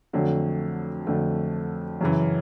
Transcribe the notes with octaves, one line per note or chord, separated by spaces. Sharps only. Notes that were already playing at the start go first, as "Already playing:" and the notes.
F2 D3 F#3 A3
F2 D3 F#3 A3
F#2 C#3 E3